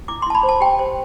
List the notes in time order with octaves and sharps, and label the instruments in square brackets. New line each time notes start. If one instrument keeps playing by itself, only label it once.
[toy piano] E4 D6
C6
E4 A5
B5
C5
A5
G4 G5
C5